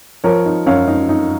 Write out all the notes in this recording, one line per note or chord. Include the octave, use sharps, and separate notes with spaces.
F3 A#4 C#5
D#4
F#2 C#5 F5
D#4
D#4